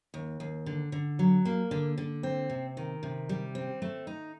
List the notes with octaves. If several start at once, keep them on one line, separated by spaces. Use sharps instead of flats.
D#2
D#2
D3
D3
F#3
A#3
D3
D3
C4
C3
D#3
C3
G3
C4
A3
D#4